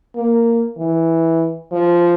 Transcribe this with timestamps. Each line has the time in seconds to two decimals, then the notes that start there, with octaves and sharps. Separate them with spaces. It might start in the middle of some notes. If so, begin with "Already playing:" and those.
0.16 A#3
0.78 E3
1.72 F3